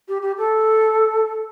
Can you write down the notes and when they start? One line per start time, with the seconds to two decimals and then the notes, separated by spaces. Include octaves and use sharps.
0.08 G4
0.22 G4
0.37 A4